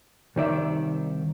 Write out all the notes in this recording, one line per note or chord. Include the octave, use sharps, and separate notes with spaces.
C2 D#3 D5 E5